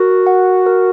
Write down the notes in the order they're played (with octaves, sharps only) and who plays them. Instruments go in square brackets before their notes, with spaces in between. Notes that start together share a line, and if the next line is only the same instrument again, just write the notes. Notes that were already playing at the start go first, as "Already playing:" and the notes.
Already playing: [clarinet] F#4 [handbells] A#4
[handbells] F#5
A#4